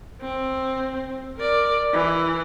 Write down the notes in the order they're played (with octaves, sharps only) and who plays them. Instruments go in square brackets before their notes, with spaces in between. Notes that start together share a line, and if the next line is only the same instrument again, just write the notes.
[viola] C4
A#4 D5
E3